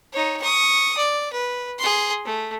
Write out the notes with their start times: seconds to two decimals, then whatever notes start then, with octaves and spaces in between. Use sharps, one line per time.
0.12 D#4 C#5
0.41 C#6 D#6
0.97 D5
1.32 B4
1.79 G#4 C6
2.25 A3